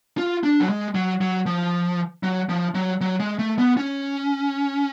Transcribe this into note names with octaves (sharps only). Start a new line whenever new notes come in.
F4
D4
F#3
G#3
F#3
F#3
F3
F#3
F3
F#3
F#3
G#3
A3
B3
C#4